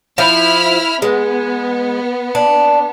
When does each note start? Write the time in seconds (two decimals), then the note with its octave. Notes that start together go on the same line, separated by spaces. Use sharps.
0.18 F3 E4 B5 F6
1.02 G#3 B3
2.35 D4